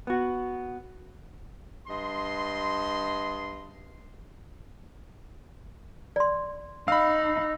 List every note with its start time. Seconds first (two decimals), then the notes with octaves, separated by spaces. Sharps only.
0.07 B3 F#4
1.88 G2 D#5 C6
6.16 D5 C6
6.88 D#4 F5 B5 E6